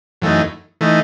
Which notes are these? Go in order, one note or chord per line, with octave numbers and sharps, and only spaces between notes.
F#2 E3 A3 D#4
E3 A3 D#4